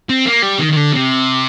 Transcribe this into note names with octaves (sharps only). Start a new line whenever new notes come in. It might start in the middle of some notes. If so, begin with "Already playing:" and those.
C4
A#3
G3
D#3
D#3
D3
C3